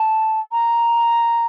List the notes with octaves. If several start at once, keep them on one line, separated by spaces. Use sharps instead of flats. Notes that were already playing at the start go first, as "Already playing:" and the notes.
Already playing: A5
A#5